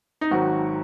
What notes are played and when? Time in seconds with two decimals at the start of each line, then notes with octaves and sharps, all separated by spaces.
0.21 D#4
0.31 G#1 G#2 D#3 F#3 F#4